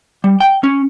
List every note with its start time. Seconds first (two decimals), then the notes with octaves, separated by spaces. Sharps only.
0.24 G3
0.40 G5
0.64 C#4